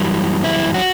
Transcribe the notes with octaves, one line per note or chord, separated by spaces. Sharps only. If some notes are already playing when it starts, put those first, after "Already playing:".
Already playing: F#2 E3 G3 F#4
E4
F#4